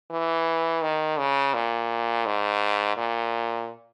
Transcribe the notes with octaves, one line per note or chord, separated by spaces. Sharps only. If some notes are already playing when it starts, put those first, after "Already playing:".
E3
D#3
C#3
A#2
G#2
A#2